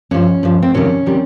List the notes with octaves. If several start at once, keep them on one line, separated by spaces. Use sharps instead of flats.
G2 F3 C#4
G2 F3
C4
F2 C3 D#3 G3 C#4
C3 D#3 G3